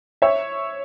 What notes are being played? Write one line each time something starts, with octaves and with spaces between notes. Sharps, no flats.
C#5 E5